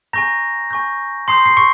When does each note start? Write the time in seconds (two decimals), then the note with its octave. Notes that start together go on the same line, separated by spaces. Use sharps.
0.13 G#5 A#5 C#6 G6 A#6
0.71 G#5 C#6 G6
1.28 A#5 C6 D#6 G6 C7
1.46 C7
1.57 C#6 C#7